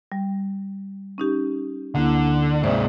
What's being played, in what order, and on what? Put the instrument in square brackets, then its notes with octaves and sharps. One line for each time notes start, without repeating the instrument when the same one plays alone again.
[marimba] G3
C#4 D#4 G4
[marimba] D2 A#3 E4 [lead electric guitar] D3
[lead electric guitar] G#2 C3 [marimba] C5 D5 E5